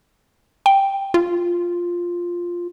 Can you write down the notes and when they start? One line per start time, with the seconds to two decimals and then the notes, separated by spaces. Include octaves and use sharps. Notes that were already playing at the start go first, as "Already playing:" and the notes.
0.66 G5
1.14 F4